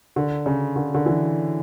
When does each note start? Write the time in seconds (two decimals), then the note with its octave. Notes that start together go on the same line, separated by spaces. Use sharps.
0.16 D3
0.46 C#3
0.76 D3
0.94 D3
1.06 E3